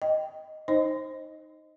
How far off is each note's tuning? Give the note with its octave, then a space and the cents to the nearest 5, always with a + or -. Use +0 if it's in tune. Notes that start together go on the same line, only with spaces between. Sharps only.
D#5 +0 G5 +0
D#4 +0 C5 +20 D#5 +0